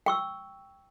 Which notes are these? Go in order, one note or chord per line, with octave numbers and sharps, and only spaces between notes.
G5 C#6 E6